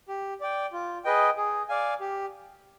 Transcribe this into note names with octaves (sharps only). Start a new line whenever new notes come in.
G4
D5 G5
F4
G#4 B4 D#5 G5
G#4
D5 F5 G#5
G4